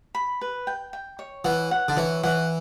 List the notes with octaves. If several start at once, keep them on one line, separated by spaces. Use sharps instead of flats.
B5
B4
G5
G5
C#5
E3 F#5
F#5
D3
E3 C#5
E3 F#5